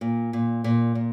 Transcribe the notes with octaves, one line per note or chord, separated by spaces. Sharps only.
A#2
A#2
A#2
A#2